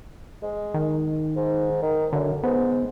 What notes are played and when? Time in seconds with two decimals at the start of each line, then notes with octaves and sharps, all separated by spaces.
0.43 G#3
0.74 D#3
1.36 G#2
1.82 D#3
2.13 F#2 D3
2.43 G#2 B3